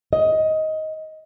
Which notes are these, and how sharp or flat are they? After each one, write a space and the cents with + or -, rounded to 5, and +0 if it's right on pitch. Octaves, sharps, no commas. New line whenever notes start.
D#5 +15